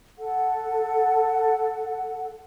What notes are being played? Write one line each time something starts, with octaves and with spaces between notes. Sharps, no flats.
A4 F#5